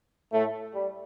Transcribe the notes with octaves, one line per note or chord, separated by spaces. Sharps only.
A2 A3
G3